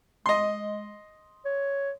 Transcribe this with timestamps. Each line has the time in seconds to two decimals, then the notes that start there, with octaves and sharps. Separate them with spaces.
0.26 G#3 D#5 C6
1.45 C#5